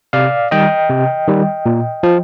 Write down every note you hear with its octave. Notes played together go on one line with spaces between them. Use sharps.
C3 D5 F5
D#3 G3 D#5 G5
C3
D#3 G3
A#2
F3